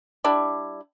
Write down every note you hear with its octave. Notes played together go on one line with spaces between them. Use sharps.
G3 D4 E4